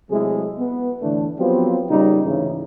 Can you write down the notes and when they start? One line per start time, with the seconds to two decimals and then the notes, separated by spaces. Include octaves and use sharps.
0.11 C3 F#3 G#3 A3 E4 G#4
0.59 B3
1.02 A2 D3 E3 A3 D4
1.39 F3 F#3 B3 C4 F4 G4
1.89 A#2 C#3 G3 D#4
2.25 D2 G#2 C#3 E3